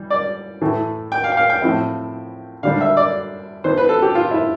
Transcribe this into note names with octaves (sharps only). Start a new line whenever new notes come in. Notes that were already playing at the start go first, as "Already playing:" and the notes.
Already playing: E3 G3
D5
A2 E3 A3
G5
F5
G5
F5
G5
A2 F3 C4 E4
D3 G3 D4 F5
E5
D5
E3 B3 D4 C5
B4
A4
G4
F4
E4